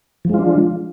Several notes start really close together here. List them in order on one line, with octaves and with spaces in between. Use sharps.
F3 G#3 F4 D4